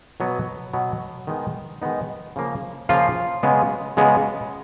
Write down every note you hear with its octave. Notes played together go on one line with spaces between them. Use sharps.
B2 F#3 B3
B2 F#3 B3
D#3 G#3 B3 D#4
D#3 G#3 B3 D#4
C#3 F3 A#3
C#3 F3 A#3 F4 F5
C#3 G#3 B3
C#3 G#3 B3